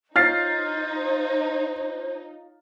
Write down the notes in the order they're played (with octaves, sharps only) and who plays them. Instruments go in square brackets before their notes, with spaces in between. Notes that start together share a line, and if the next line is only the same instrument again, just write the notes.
[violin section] D#4 [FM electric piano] F4 C#5 F5 [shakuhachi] C5 [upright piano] F6 A6 C7